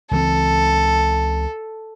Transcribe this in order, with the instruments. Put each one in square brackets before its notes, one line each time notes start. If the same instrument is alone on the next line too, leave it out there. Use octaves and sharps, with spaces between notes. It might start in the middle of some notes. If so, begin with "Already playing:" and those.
[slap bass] C#2 E3 C4 [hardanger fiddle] A4